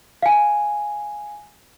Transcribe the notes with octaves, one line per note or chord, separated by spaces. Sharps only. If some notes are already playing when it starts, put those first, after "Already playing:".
F5 G#5